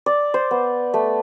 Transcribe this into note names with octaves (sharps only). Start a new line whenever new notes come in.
D5
C5
B3
A3